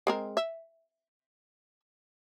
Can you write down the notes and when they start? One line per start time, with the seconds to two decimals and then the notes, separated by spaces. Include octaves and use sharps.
0.07 G#3 C4 A#4
0.37 E5